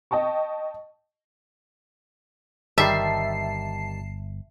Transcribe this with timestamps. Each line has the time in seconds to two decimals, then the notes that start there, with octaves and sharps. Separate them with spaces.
0.11 D#5 G5 A5 C#6
2.78 G1 D#3 G3 E5 A5 C7